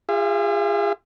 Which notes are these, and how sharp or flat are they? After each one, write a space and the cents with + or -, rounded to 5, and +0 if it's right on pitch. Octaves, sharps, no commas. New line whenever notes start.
F4 +0 G#4 -35 E5 +40